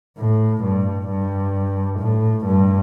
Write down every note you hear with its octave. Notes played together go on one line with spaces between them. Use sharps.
A2
G2
G2
A2
G2